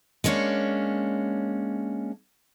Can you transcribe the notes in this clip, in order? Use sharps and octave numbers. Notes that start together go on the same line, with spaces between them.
G#3 A#3 C#4 D4 C#5